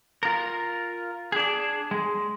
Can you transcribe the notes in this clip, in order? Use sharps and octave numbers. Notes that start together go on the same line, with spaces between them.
F4 A#4
D4 G#4
G#3